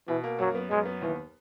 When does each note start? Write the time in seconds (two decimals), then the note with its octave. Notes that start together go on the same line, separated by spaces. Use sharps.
0.08 B2 E3
0.24 A#3
0.39 F#2 F#3
0.55 B3
0.70 F#2 G#3
0.86 B3
1.02 D#2 E3